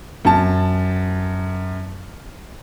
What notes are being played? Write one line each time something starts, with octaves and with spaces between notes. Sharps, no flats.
F#2 A5